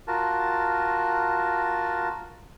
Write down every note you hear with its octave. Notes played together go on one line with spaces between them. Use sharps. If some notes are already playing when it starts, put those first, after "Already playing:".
F4 F#4 A#4 A5